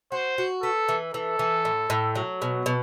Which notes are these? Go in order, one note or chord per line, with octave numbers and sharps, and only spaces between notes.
F#4 C5
F#4
B3 A4
E3
E3 A4
E3
A2
A2
F#3
B2
B2